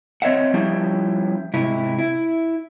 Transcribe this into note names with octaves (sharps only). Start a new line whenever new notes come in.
C4 C#5 D#5 E5 F#5
F3 G3 C#4 E4 G4
G#2 C3 E4
E4